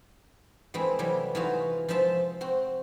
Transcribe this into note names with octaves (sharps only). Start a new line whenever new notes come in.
E3 G#3 A3 C4 E4
C3 E3 F#3 G3
E3 G#3 D#4 F4 F#4
F3 G#3 C5 E5 A5
C4 F#4